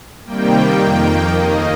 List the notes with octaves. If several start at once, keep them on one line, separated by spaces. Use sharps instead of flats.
C3 D#3 G3 A#3 G5
F2 D#3 A#3
D#2 D#3 A#3 D#5